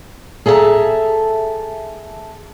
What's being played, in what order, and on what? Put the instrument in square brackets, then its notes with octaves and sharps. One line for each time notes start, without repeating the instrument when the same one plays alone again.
[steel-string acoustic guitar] G#4 A4 E5 F5 A5 A#5